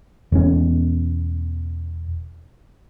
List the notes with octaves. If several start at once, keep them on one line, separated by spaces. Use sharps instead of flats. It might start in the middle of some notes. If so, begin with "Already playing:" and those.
E1 C#4